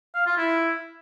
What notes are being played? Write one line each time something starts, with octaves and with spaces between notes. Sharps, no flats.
F5
F4
E4